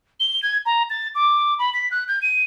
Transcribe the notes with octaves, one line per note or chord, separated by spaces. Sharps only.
G7
G#6
A#5
A6
D6
B5
B6
F#6
G6
D#7